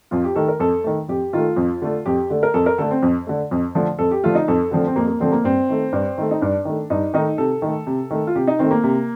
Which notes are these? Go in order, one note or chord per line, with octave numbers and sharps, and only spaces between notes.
F2 F4
G4
D#3 A3 A4
A#4
F2 A4
D#3 A3
F2 G4
D#3 A3 F4
F2
D3 A3
F2 G4
D3 A3
A#4
F2 A4
A#4
D3 A3 A4
C4
F2
D3 A3
F2
D3 F3 A3
F2 A4
G4
D3 F3 A3 F4
D#4
F2 A4
D3 F3 A3 C4
C4
F2 A#3
A#3
D3 F3 A3 C4
A#3
G2 C4
D#3 A3
G2
D#3 A3
D#4
G2 D4
D#3 A3
G2 D#4
D#3 A3 D#4
C3 A4
D#3 A3
C3
D#3 A3
F4
C3 G4
D#4
D#3 A3 C4
A#3
C3